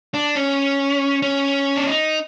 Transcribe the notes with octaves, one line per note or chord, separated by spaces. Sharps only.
D4
C#4
C#4
D4
D#4